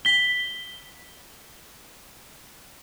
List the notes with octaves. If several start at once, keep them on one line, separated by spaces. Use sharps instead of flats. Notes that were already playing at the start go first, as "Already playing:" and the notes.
B6 G7